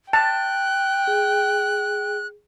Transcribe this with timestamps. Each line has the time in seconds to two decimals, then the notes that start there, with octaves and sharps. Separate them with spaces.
0.13 G5 A5 F#6
1.07 G#4